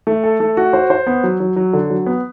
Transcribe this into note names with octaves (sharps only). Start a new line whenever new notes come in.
A3
A4
A3
F#4
C5
C5
B3
F#3
F#3
F#3
D3
F#3
B3